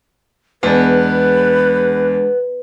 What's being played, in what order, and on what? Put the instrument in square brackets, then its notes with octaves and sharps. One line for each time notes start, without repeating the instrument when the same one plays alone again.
[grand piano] E2 [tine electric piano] G#3 D4 G#4 [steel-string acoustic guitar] B3 [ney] B4